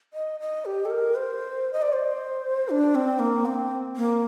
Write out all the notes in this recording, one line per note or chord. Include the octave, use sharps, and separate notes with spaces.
D#5
D#5
G4
A4
A#4
C5
D#5
D5
C5
D4
C4
A#3
C4
A#3